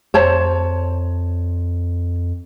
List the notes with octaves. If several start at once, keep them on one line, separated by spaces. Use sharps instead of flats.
F2 C5 C#5 A5